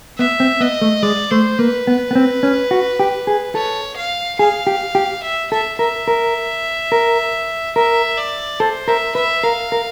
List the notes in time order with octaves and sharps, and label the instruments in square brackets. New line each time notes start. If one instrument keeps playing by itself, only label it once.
[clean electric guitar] B3 [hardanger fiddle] E5
[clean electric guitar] C4
[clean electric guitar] B3 [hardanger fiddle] D#5
[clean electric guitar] A3
[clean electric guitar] G#3 [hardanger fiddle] D5
[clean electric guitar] A3 [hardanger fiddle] C5
[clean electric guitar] A#3 [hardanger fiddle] B4
[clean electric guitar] B3
B3
C4
C#4
F#4
G4
G#4
[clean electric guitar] A4 [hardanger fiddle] C#5
[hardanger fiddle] F5
[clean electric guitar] G#4 [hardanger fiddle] F5
[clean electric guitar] G4
G4
[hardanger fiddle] E5
[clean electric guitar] A4 [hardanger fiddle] E5
[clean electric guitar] A#4 [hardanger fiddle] E5
[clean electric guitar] A#4
A#4
[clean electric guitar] A#4 [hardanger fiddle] E5
[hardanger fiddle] D5
[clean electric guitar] A4 [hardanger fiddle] C5
[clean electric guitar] A#4 [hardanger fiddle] E5
[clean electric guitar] B4 [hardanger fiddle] E5
[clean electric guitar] A#4 [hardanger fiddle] F5
[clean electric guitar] A#4